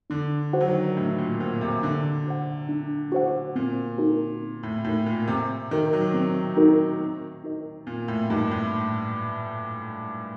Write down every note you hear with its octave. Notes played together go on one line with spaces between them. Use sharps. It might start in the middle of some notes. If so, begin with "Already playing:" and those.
D3 D4
F#4 C5 F#5
F#3
D#3
A2 D4
A#2
A#2 F#4 C5 F#5
C3
D3 D4
F#4 C5 F#5
D4
F#4 C5 F#5
A#2 C4
D#4 F#4 A#4
C4
A2
A2 D#4 F#4 A#4
A#2
C3 C4
D#3 D#4 F#4 A#4
F#3
C4
D#4 F#4 A#4
C4
D#4 F#4 A#4 D#5
A#2 C4
A2
G2 D#4 F#4 A#4 D#5
A2